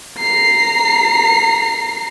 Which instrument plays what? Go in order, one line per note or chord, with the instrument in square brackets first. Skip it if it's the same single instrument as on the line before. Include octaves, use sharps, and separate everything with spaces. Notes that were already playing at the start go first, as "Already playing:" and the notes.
[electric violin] A#5 C7